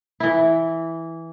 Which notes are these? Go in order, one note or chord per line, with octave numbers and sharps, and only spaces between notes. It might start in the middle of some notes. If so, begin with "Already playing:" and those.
E3 E4